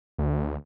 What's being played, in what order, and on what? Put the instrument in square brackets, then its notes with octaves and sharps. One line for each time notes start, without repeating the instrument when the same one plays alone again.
[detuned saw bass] D2